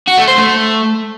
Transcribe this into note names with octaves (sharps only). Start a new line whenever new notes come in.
F#4
A3
C5
A3